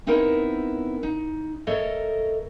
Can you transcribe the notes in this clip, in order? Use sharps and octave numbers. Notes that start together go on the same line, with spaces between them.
B3 C4 D#4 E4 A#4 C#5
D#4
A3 A4 A#4 C#5 D#5